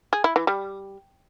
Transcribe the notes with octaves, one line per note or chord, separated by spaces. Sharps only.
G#4
E4
E3
G3